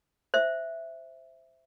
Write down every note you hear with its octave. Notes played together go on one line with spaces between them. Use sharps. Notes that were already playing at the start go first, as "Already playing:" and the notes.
C5 E5